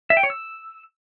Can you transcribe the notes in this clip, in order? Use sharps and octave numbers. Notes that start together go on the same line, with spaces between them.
E5
G5
C#5
E6